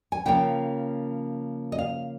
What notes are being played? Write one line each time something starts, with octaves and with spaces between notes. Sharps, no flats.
G#5
C#3 F3 A#3 C#4 G5
D#5
F5